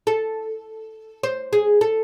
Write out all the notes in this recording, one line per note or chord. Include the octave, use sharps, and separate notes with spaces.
A4
C5
G#4
A4